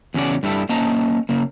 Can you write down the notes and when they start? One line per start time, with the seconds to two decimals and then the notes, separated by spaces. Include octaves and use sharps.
0.14 E2 C#3 C#4 F#4 D5
0.43 G2 G3 E4 A4
0.69 A#3 C#4 C5 D#5 A5 A#5
1.29 C#3 A#3